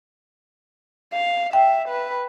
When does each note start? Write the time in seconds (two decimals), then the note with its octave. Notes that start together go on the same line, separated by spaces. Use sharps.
1.13 F5
1.53 E5 G5
1.89 B4